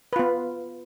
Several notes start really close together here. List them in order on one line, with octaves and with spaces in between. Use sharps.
B4 F4 B3